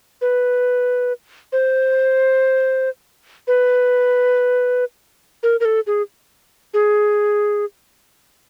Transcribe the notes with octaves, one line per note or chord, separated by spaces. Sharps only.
B4
C5
B4
A#4
A#4
A4
G#4
G#4